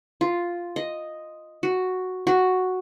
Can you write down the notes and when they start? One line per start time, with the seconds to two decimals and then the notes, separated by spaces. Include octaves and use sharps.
0.21 F4
0.76 D#5
1.63 F#4
2.27 F#4